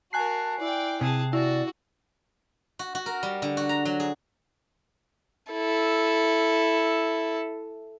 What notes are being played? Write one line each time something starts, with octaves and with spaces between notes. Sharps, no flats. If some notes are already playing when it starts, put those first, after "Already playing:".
F#4 A#4 G#5 A5 F#6 C7
E4 D5 G5
C3 G#4 A5
E4 F#4 D5
F#4
F#4
A#4
G3
D3
F#4
A#5
F#3
G#4
E4 A4